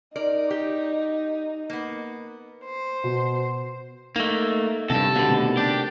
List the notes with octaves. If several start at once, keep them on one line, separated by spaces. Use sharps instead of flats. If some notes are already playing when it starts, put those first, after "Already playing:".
D#4 A#4 D5
G4
A#3 B3
C5
B2
A3 A#3 D#4
E2 G2 C3 A4
B2 D3
D#3 A3 C4
D4 G4